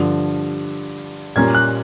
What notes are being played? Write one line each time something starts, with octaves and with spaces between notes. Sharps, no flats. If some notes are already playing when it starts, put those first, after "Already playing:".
Already playing: G2 D3 F3
A#2 G3 A#3 C#4 G#6
F#6